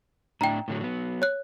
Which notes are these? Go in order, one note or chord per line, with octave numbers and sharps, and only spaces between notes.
A2 D4 E4 G5 A#5
A2 D3 F#3
F#3 B3
C#5 F#6